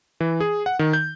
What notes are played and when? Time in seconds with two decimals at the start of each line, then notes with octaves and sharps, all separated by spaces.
0.20 E3
0.40 G#4
0.66 F#5
0.79 D#3
0.93 G6